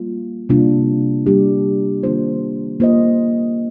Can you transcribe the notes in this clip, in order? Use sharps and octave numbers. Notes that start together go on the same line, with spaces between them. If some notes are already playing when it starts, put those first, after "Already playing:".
Already playing: G3 A#3 F4
C3 G3 A#3 D4 F4
G3 A#3 D4 G4
D#3 A#3 D4 F4 C5
A#3 F4 C5 D#5